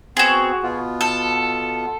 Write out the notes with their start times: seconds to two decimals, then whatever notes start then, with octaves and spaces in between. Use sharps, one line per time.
0.17 B3 C4 F#4 G#4
0.63 B2 B3 F4
1.01 A4